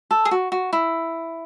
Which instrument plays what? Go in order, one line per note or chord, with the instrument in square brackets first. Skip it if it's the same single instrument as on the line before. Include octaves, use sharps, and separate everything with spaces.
[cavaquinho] A4
G#4
F#4
F#4
E4